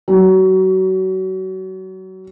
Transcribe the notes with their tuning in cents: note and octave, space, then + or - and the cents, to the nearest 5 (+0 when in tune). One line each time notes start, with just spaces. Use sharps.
F#3 +30